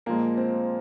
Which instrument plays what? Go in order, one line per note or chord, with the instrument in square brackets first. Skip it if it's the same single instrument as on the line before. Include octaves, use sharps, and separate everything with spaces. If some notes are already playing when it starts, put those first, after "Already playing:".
[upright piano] A#2 F3 G#3 [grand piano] A#3
[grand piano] C4